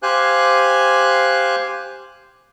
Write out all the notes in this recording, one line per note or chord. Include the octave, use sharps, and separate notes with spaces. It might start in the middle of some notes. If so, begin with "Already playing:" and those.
G4 C5 F5 G#5 F#6